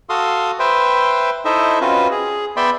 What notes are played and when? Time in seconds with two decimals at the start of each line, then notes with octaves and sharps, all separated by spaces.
0.09 F#4 A4 F5 C6 D#6
0.59 B4 C5 E5 G5 C6
1.45 D#4 E4 A4 C5 D#5 E5
1.81 C4 C#4 F4 F#4 B4
2.11 G#4
2.57 B3 D5 E5 G5 B5 C6